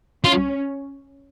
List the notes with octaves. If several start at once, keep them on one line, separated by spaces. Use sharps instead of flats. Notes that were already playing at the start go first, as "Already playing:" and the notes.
C#4 F4